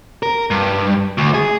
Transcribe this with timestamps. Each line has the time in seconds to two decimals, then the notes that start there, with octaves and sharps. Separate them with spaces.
0.23 A#4
0.51 G2
1.18 D2
1.34 G#4